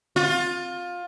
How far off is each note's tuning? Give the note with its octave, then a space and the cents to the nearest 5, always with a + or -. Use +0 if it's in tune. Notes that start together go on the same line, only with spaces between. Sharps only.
F4 +20